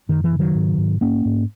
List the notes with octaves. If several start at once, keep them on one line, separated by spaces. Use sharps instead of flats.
F#2 D#3
E3
C#3
D#3 F#3
G#2
G#2
G#2 A#3 C#4
G#2